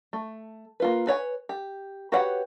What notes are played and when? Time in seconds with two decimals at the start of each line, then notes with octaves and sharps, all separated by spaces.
0.13 A3
0.80 A#3 F4 B4
1.07 B4 C#5 G5 G#5
1.49 G4
2.12 F#4 G4 B4 C#5 F#5